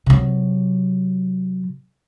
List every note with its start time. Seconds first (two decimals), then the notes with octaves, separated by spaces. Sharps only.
0.06 C3 F#3